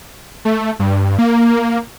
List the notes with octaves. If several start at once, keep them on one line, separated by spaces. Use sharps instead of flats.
A3
G2
A#3